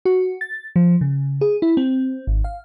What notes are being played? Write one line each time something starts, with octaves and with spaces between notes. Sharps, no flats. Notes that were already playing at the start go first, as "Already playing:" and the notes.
F#4
A6
F3
C#3
G#4
E4
C4
G#1
F5